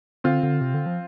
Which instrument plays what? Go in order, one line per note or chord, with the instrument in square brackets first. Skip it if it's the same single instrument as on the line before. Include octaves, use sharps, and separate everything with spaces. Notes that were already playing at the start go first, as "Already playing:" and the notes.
[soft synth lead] D3 [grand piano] C4 F4
[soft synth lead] D3
C3
D3
F3